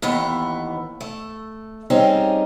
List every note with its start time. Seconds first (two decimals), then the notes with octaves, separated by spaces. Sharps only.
0.02 D#2 A2 E3 B3
1.01 A3
1.90 G3 C4 C#4 D#4 G#4